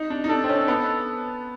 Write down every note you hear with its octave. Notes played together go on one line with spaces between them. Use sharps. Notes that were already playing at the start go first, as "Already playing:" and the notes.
Already playing: D#4
D4
D#4
D4 A4
C4
C#4
B3